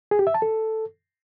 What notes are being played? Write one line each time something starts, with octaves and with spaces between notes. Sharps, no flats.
G#4
G4
E5
A5
A4